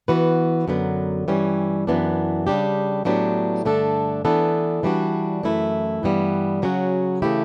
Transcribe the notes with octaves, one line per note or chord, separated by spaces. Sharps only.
E3 B3 F#4 B4
F#2 D3 F#3 B3
G2 E3 G3 C#4
F#2 E3 B3 D4
C#3 G3 D4 G4
A2 F#3 B3 D4 G4
G2 D3 A3 D4 A4
E3 B3 D4 A4
E3 G3 D4 F#4
F#2 E3 A3 E4
G2 E3 G3 B3
C#3 F#3 C#4 F#4
C#3 E3 A3 E4 G4